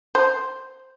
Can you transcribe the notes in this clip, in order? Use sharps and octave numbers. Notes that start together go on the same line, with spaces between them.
C5